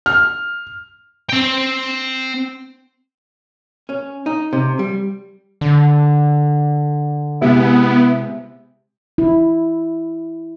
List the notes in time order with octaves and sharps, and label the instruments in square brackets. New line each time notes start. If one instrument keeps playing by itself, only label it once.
[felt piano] F6
[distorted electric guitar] C4 G5
[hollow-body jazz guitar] C#4
D#4
C3
G3
[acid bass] D3
[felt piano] C3 G#3 [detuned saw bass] B3 [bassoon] E4
[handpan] E4